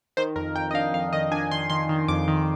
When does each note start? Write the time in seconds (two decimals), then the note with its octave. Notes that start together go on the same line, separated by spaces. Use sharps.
0.17 D#3 C5
0.36 F2 A#4
0.55 F2 G5
0.71 D#5
0.74 D4 F5
0.93 F2 F5
1.13 D#3 D#5
1.32 D4 G#5
1.51 D#3 C6
1.70 D#3 C6
1.89 D#3
2.08 F2 D6
2.28 D#3